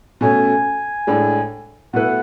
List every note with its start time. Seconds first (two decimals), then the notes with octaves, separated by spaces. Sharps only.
0.21 B2 A3 C#4 G#5
1.07 A2 G#3 D4 A4
1.93 B2 A3 E4 B4 F#5